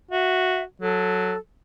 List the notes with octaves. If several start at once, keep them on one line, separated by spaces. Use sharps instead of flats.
F#4 E5
F#3 A4